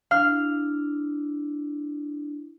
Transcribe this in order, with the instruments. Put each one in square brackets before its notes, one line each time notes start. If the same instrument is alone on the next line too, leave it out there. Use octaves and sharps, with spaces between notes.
[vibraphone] D4 E4 [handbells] F5 [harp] F6